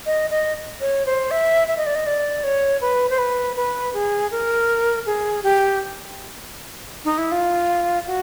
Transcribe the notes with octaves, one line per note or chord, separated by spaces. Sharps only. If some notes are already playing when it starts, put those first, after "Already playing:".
D#5
D#5
C#5
C5
E5
E5
D#5
D5
D#5
D5
C#5
B4
C5
B4
B4
G#4
A#4
G#4
G4
D#4
E4
F4
F#4